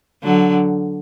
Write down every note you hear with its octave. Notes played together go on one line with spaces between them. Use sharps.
D3 F#3